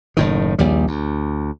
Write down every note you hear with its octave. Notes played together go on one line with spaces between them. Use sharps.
F#1 A2 D#3
A#1 D#2 G3
D2